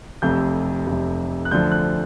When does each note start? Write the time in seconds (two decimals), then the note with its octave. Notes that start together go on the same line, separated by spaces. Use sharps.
0.22 F1 F2 C3 G6
0.87 F1 F2 C3
1.45 F#6
1.51 D2 D3 F3 G6
1.72 F#6